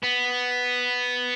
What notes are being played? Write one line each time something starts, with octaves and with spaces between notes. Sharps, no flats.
B3